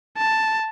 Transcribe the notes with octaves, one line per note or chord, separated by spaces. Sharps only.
A5